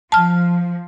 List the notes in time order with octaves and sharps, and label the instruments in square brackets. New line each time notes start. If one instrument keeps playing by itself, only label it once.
[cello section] F3 [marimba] A5 F6